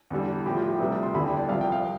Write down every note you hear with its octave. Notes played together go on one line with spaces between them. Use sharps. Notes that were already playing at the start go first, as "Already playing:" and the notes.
E2 D3 G3
A2 F3 G4
F4
G4
D2 C3 G3 B4
D5
C6
E2 D3 G3 B5
G5
D5
C2 C3 F3 F5
G5
F5